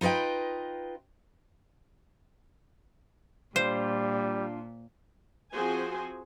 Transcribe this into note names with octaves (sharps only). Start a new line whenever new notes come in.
D#4 F4 B4 D#5 G5
A#2 G3 D4 F4 C5
F3 C4 F#4 G#4 C5 G#5